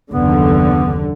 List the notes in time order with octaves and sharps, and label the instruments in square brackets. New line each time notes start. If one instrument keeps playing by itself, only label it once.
[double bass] F#1 D#2 [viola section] D3 [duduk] B3